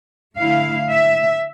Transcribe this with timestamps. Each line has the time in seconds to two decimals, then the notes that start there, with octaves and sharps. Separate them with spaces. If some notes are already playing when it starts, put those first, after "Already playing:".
0.37 D3 A3 E4 F5
0.91 E5